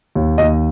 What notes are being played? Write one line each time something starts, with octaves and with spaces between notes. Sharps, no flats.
D#2
D#2 D#5